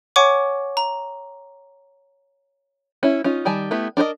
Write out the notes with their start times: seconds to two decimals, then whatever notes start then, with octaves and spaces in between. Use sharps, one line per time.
0.16 C#5 F#5 G#5 C#6 D6
0.77 A#5
3.03 C#4 E4
3.24 C#4 D#4 F4
3.45 D#3 G3 G#5 A5
3.71 A3 B3 E4 G4
3.97 D4 A#4 C5 D#5